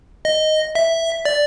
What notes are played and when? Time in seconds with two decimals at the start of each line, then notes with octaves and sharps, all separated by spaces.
0.25 D#5
0.75 E5
1.25 D5